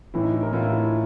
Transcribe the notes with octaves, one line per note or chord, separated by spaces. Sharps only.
A2 E3 E4
D#4
E4
A#4
A2 E3 F4
E4
E4